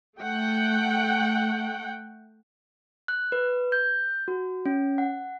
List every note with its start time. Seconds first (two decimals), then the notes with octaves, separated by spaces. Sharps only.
0.19 A3 F#5 G5
3.08 F#6
3.32 B4
3.72 G6
4.28 F#4
4.66 C#4
4.98 F#5